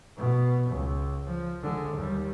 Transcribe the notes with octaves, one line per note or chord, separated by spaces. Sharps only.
B2
C#2
F3
D3 G#3
D#2 G3